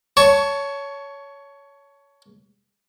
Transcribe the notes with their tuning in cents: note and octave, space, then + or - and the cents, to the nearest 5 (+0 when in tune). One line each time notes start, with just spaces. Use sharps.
C#5 +15 A5 +0 C#6 +0